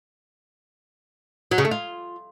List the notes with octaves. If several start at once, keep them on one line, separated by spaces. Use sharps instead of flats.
F#3
C#3
A3
F4